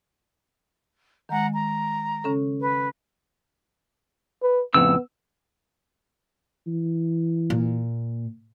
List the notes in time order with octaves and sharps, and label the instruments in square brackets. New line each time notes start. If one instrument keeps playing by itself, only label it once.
[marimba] D#3 G#3 [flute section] F#5 A#5
[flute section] A#5
[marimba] C#3 C#4 A4
[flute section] B4
[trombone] B4
[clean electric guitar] F2 A2 C#3 [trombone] B3 [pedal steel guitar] E6
[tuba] E3
[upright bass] A#2